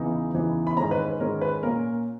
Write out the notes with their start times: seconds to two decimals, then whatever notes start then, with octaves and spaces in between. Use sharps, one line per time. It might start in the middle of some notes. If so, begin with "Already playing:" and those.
Already playing: E2 C#3 E3 B3 D#4
0.34 E2 C#3 E3 B3 D#4
0.67 B5
0.77 G#2 D#3 G#3 C#4 A#5
0.91 B4
1.05 B4
1.20 G#2 D#3 G#3 C#4 A#4
1.41 B4
1.62 A#2 A#3 C#4 A#4